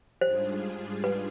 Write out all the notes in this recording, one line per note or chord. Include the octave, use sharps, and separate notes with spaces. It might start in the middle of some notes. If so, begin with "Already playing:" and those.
G#2 G3 D4 F4 G#4 C5
B4